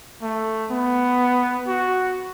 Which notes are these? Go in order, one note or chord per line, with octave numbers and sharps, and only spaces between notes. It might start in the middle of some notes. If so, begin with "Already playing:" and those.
A3
B3
F#4